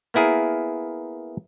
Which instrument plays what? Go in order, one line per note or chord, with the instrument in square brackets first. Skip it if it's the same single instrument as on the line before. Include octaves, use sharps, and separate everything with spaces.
[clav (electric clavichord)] A#3 B3 E4 G#4 A#4